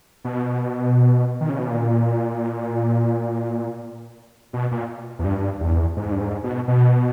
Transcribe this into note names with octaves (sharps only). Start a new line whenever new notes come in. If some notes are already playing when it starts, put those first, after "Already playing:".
B2
D#3
C#3
B2
A#2
B2
A#2
E2
G2
E2
G#2
G2
G#2
B2
B2